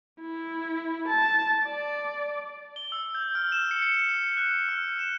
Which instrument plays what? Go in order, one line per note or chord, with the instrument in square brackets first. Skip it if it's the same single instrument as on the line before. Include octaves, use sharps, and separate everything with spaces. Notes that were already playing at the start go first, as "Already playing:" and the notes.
[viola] E4
A5
D5
[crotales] G7
E6
G6
F6
E7
C#7
C#7
F#6
F6
E7